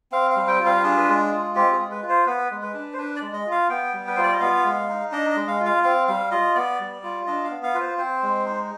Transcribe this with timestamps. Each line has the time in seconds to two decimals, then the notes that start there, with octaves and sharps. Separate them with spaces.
0.12 C4 F5
0.31 F5
0.36 G3
0.48 G5
0.60 F4
0.66 F5
0.83 D4 G#4
0.97 B4
1.08 G#3 G#4
1.31 F4
1.55 C4 G4
1.72 G#4
1.78 G#3
1.91 B4
2.02 F4
2.09 C5
2.26 B3 B4
2.51 G#3
2.62 B4
2.74 D4
2.93 C5
2.98 D4 B4
3.16 D5
3.21 G#3
3.33 D#5
3.46 F4
3.52 F5
3.69 B3 G5
3.93 G3
4.07 B4
4.16 F4 C5
4.23 D5
4.33 D#5
4.40 B3 F5
4.65 G#3
4.89 D#4
5.12 D4 D#5
5.30 D#5
5.36 G#3
5.48 F5
5.60 F4
5.66 F5
5.84 C4 F5
6.08 G3 F5
6.31 F4 D#5
6.55 B3 D5
6.80 G3
7.03 F4
7.27 D4 D#5
7.44 F5
7.50 B3
7.63 F5
7.74 F4 B4
7.80 C5
7.98 C4 C5
8.23 G#3
8.45 D#4